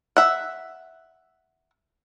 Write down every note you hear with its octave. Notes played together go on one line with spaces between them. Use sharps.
E5 F#5